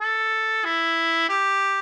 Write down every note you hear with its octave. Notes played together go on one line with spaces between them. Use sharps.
A4
E4
G4